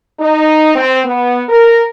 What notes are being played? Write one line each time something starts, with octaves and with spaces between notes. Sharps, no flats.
D#4
C4
B3
A#4